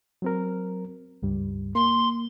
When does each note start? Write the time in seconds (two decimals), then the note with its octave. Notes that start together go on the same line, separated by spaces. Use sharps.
0.22 F#3 C4 A#4
1.22 C#2 G2 G3
1.75 A#3 C6